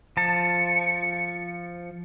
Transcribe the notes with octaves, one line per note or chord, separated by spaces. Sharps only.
F3 A5 C#7